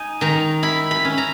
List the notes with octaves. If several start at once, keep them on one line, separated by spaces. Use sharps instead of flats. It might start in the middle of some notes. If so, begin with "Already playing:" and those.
Already playing: D#4 G#5
D#3 A#5
E4 B5
B5
C#4
A#5